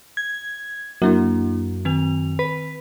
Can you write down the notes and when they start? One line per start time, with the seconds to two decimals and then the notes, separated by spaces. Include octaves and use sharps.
0.17 G#6
1.02 F#2 A#3 D4 E4
1.85 D#3 C4 F7
2.39 B4